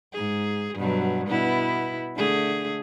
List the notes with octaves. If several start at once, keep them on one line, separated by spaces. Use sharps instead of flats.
G#2 G#4
G2 B2 F#3
B2 B3 E4
D3 A3 G#4